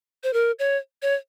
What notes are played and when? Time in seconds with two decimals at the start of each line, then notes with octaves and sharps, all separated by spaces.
0.23 C5
0.33 A#4
0.59 C#5
1.02 C#5